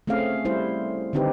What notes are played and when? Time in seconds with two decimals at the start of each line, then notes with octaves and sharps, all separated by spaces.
0.07 A3 C4 C#4 G#4 F5
0.45 G3 E4 C5
1.13 D3 D#3 C4 D#4 G4 B4